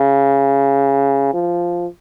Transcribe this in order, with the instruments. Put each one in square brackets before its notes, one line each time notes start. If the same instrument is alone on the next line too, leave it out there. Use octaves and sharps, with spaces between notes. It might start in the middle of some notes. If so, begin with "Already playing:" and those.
Already playing: [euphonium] C#3
F3